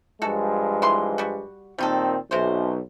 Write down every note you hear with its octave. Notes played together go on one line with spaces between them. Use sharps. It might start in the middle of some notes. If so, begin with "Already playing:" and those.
G2 F3 G#3 F#4 A4
E3 C6
G3 F#4
A#2 D#3 G3 C4 D#4 A4
B1 C3 C#4 C5